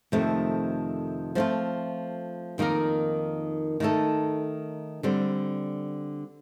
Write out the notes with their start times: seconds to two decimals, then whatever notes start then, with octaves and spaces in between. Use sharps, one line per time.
0.12 F2 C3 D#3 A3
1.35 F3 A3 C4 F4
2.58 F2 D#3 A#3 D#4 A#4
3.80 D#3 A3 D#4 A4
5.03 D3 G3 C4